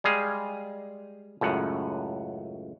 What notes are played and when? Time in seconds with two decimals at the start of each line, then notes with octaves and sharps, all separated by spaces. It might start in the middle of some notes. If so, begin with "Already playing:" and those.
0.04 G3 G#3 G#4 F5
1.41 C#2 F#2 A2 F#5